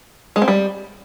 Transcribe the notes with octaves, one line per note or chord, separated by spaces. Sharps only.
G#3
C4
G3